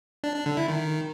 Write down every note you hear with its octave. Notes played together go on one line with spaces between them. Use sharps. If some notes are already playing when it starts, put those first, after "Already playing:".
D4
D4
D3
E4
D#3